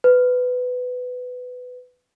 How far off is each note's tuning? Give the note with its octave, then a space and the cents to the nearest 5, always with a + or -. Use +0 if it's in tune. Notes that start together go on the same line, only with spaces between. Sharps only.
B4 +15